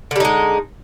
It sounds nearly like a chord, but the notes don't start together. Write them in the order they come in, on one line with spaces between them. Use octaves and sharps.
D3 G3 D#4 G#3